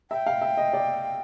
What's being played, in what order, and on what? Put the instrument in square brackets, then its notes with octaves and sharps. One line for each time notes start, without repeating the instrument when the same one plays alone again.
[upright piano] E5 [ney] G5
[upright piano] F5
E5
D#5
D5